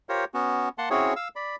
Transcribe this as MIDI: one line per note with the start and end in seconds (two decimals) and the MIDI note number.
0.09 0.25 65
0.09 0.25 67
0.09 0.25 70
0.09 0.25 72
0.09 0.25 73
0.34 0.69 59
0.34 0.69 61
0.34 0.69 66
0.78 0.89 58
0.78 0.89 78
0.78 0.89 81
0.78 0.89 84
0.90 1.14 60
0.90 1.14 61
0.90 1.14 64
0.90 1.14 66
0.90 1.14 68
0.90 1.14 73
1.16 1.28 77
1.16 1.28 88
1.36 1.56 74
1.36 1.56 83